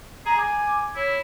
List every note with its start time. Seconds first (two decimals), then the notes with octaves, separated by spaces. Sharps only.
0.26 G#4 A#5
0.38 G#5 D6
0.95 E4 C#5